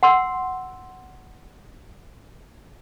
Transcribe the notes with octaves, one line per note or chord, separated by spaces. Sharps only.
F#5 C6 E6